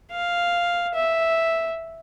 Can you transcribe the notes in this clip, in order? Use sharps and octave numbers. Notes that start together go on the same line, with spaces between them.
F5
E5